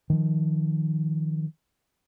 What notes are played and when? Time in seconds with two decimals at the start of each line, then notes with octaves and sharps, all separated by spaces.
0.10 D#3 F3